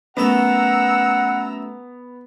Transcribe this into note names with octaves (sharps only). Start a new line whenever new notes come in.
F#2 A3 B3 F#5 A#5 C#6 E6